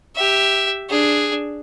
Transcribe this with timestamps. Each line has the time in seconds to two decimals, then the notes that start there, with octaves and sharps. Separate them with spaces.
0.16 G4 E5
0.89 D4 G#4